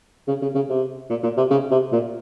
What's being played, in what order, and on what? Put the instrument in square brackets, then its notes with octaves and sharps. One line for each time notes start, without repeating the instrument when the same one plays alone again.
[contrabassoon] C#3
C#3
C#3
C3
A#2
A#2
C3
C#3
C3
A#2